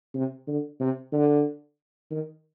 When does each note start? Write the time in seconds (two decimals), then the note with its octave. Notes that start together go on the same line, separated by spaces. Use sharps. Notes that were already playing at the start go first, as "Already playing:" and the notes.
0.15 C3
0.47 D3
0.80 C3
1.12 D3
2.11 D#3